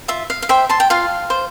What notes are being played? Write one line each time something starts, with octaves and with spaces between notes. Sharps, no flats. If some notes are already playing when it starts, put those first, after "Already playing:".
F4 E5
F5
F5
C5 E5 G5
A5 C6
G5
F4 F5
C5